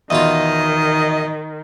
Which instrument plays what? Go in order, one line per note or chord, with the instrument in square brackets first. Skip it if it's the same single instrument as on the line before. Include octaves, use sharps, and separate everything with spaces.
[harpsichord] E2 B2 F4 [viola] D#3 [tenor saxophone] D#5